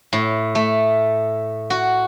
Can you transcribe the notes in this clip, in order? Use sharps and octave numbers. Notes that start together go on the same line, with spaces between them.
A2
A3
F#4